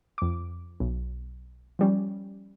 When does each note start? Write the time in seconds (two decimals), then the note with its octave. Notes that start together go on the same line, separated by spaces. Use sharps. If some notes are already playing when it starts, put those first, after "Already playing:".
0.18 F2 D6
0.80 B1
1.79 F3 G3 C#4